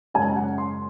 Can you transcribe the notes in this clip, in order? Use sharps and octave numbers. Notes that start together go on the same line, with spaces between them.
F#2 C#3 G#3 C#4 G#5
F#5
C6